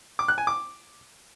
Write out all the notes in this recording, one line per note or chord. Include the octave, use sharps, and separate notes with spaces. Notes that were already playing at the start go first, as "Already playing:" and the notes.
D6
F#6
G#5
D6